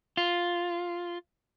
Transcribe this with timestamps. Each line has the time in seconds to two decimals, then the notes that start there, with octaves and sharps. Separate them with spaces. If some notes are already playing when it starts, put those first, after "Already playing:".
0.17 F4